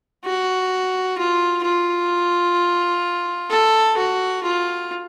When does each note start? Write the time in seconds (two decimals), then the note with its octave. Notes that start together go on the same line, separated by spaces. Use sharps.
0.25 F#4
1.18 F4
1.64 F4
3.51 A4
3.97 F#4
4.43 F4